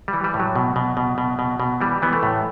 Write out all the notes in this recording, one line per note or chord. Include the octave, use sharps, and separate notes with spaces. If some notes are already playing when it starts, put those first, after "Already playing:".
G3
E3
G3
A2
F#3
B2
B2
B2
B2
B2
B2
E3 G3
E3 B3
A3
A2